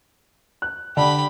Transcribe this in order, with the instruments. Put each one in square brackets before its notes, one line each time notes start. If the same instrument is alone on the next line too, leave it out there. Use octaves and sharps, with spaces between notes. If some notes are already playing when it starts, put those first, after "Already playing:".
[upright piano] F#6
[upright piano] D3 [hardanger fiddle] G4 B5